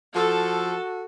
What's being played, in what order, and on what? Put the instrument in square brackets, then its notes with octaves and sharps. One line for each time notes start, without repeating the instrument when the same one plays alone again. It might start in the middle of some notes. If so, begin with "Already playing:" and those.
[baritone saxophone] F3 [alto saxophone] F#4 [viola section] A4